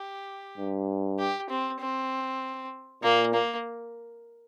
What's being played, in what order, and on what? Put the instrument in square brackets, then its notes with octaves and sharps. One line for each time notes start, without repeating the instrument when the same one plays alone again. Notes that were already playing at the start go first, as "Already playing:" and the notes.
Already playing: [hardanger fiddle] G4
[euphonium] G2
[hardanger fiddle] G4
C4
C4
[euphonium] A#2 [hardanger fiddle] A#3
[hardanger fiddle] A#3